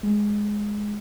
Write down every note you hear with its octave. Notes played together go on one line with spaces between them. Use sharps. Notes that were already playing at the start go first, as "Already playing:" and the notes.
G#3